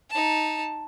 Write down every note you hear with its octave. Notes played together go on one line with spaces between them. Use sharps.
D#4 A5